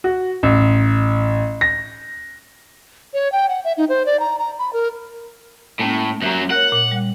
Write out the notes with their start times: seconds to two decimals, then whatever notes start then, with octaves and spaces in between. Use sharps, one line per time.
0.04 F#4
0.43 A1
1.61 A#6
3.14 C#5
3.32 G5
3.49 F#5
3.64 E5
3.77 D#4
3.89 C5
4.06 D5
4.20 A#5
4.39 A#5
4.59 B5
4.73 A#4
5.80 A2 G#3 A#3 C#4
6.22 F#2 F#3 E5 A#5
6.51 A#4 C#5 F#5
6.72 A#2
6.91 G3